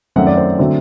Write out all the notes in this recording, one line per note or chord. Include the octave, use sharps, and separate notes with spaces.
F#2 D#3 A3 C4 F#5
D5
C5
D3 F#3 A3 C4